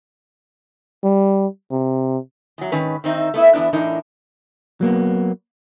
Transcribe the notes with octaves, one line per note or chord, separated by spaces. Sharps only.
G3
C3
E2 F#3
G#2 D#3 C#4 B4
D#3 C4 D#4 E5
A3 B3 E4 E5
E2 G#2 B3 D4 E4
A2 E3 D4 D#4 A#4
F#3 A#3 B3